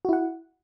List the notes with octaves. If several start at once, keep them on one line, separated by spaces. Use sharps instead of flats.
E4 F#4 F#5